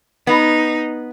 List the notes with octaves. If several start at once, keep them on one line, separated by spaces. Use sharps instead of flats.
B3 D#4